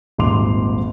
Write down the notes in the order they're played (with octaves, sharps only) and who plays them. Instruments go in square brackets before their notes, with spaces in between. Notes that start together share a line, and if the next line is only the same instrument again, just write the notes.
[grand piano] D#1 G#1 G#2 C6 D6 F7